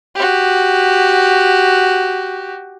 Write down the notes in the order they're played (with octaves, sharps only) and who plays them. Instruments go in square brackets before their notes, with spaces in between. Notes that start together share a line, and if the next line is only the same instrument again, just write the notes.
[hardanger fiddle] F#4 G4